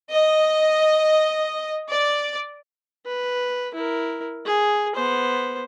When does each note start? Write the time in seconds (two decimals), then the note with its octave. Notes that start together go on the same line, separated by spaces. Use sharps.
0.11 D#5
1.90 D5
3.06 B4
3.74 E4 A#4
4.46 G#4
4.96 B3 C5